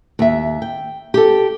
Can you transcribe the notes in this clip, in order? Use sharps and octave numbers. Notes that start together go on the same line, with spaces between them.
D#2 E5
G5
G4 A4